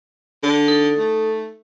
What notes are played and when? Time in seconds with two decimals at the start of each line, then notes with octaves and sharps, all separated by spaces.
0.43 D3
0.68 D#4 A4
0.98 A3